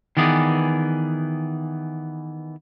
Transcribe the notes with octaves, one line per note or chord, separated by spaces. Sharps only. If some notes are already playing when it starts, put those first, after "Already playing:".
D#3 E3 B3 G#4 D5